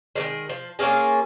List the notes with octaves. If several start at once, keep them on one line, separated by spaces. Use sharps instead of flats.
D#3 E3 G#3
F3
A#3 C#4 F4 G#4